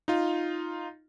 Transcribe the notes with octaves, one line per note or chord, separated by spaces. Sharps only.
D#4 F4